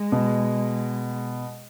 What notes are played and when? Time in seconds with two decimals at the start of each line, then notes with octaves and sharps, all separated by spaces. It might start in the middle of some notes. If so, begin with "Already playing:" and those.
Already playing: G#3
0.12 B2